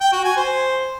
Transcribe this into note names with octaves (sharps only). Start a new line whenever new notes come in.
G5
F#4
G#5
C5